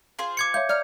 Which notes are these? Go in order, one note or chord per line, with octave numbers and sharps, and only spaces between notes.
F4 G#4 C5
D6 G#6 C#7
C#5 E5 F5 G6
D5 A#5 F6